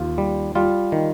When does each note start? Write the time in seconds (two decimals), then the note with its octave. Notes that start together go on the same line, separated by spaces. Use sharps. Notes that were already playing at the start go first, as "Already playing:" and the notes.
Already playing: D#2 F4
0.18 G3
0.55 G3 F4
0.92 D#3